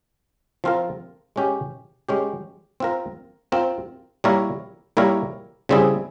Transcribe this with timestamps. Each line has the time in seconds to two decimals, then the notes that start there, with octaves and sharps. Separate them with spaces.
0.64 F3 C4 F4 A#4
1.36 G#3 C#4 G4
2.09 G#3 C#4 G4
2.80 C4 F4 A#4
3.52 C4 F4 A#4
4.24 G3 A#3 E4 A#4 C#5
4.97 G3 A#3 E4 A#4 C#5
5.69 C#3 G3 C4 E4 G#4